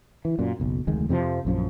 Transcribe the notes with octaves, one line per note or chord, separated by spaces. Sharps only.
E3
F#2 A#2
F#1 B1
F1 D2 D#3 G#3
F2 C3 D#3 F3
A#1 F#2 F3